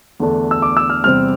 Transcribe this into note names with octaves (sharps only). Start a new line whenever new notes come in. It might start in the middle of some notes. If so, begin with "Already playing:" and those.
E2 D3 A3 D4
E6
D6
E6
F6
E2 C3 G3 C4 F6